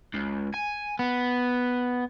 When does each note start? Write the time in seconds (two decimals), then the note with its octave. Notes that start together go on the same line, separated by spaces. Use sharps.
0.14 C#2
0.54 G#5
0.99 B3